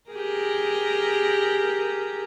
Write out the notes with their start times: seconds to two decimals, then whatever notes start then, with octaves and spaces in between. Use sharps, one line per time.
0.10 G4 G#4 A#4